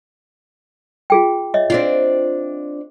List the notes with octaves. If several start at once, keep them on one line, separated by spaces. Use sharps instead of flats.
F4 G#4 G5
C#5 D#5 E5
C4 D4 F4